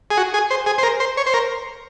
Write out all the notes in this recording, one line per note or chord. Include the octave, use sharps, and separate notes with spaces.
G#4
F#4
G#4
C5
G#4
C5
A#4
C5
C#5
C5
A#4